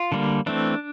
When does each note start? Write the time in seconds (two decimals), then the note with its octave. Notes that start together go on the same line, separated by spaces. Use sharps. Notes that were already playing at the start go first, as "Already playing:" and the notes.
Already playing: F4
0.12 D3 G3 A#3
0.46 E3 A3 C4 D4